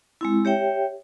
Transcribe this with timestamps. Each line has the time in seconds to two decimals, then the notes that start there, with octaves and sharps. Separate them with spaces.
0.21 G#3 C4 E4
0.45 G4 C#5 E5 G5